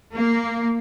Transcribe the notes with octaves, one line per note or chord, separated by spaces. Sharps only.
A#3